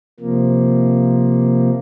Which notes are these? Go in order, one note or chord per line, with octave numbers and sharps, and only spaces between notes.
C3 F3 A#3